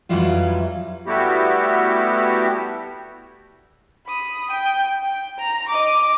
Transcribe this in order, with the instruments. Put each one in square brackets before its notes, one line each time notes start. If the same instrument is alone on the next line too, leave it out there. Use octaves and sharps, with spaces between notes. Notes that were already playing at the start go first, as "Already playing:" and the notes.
[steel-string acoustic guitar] F2 E3 F#3 G3 E4 F4
[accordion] G3 A3 B3 E4 F#4 G4
[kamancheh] B5 D#6
G5
G5
A#5
D#5 D6